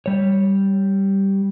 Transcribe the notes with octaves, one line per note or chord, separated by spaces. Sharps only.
G3 C#5